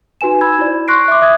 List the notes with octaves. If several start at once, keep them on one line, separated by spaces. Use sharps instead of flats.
D#4 F#4 B4 G#5 E7
B5 E6 G#6
E4 C5 D5
C6 C#6 F#6 A#6 C7 D7
E5 D6
E5 D#6 G#6